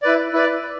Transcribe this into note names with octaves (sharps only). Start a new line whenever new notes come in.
E4 B4 D5
E4 B4 D5